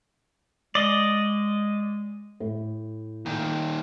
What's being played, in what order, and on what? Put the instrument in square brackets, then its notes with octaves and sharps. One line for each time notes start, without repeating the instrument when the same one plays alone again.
[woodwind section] G#3 [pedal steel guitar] D5 D#5
[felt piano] A2
[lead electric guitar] A#2 D#3